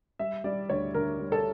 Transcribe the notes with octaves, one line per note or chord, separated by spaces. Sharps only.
G3 E5
G3 D5
D2 C#5
D2 A#4
G3
A4